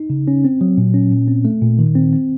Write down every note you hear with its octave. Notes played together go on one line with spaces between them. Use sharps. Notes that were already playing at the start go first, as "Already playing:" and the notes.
Already playing: D#4
C#3
C#4
C4
F#3
A#2
C#4
A#2
C4
A3
A#2
D#3
C4
C4